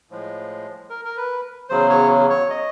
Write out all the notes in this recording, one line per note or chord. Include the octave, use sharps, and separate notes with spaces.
A2 F3 G#3
A#4
A#4
B4
E2 C#3 F#3 C5
C#5
C#5
D#5